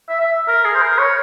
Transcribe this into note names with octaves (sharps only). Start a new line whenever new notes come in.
E5
E5
A#4
G#4
C5
A#4
C#5